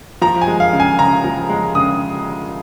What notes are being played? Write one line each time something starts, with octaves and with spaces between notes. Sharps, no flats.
F3 A#5
G#5
G#3
F5
C#3
G#5
C#3 A#5
F3
G#3
C#3 D#6